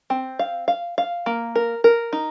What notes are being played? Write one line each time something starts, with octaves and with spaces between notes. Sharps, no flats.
C4
F5
F5
F5
A#3
A#4
A#4
D#4